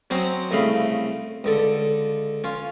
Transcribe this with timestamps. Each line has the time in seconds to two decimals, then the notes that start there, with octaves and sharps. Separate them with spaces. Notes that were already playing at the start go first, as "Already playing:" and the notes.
0.10 F#3 C4 C#4 C5 D#5
0.51 C2 C#3 A3 D#5 F5 B5
1.44 C#2 D3 A4
2.44 C#4 F4